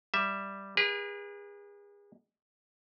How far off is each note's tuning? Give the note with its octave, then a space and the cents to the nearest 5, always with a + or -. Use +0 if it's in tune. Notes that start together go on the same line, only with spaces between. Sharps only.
G3 +0 E5 +0
G#4 -35 B4 -40